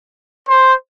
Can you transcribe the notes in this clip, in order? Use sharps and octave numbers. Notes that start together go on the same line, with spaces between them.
C5